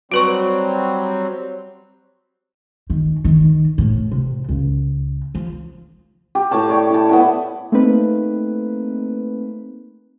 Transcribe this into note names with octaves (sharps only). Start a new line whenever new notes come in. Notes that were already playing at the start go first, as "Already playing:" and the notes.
F#3 G3 C4 F#4 B4 C#6
D#3
D#3
A2
C3
C#2
F3
G4
A2 G4 C#5 A5
C#5 D5 G5
E4 A5
B3 E4 A5
A3 A#3 C4 D#4 B4